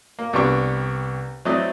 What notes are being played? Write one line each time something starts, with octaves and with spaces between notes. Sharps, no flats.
A#3
C2 B3 D4 G4 G5 C#6
F#3 A3 C4 E4 D5 D#5